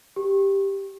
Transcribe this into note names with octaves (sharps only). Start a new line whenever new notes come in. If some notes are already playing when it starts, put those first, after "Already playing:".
G4